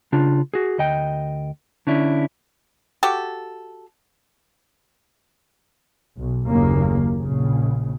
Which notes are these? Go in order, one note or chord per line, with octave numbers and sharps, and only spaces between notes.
C#3 D4 F4
F#4 G#4
D2 D#5 G5
D3 C#4 D4 E4
F#4 G4 A4
B1
F#1 D#2 C#3 A#3
A#1 C#3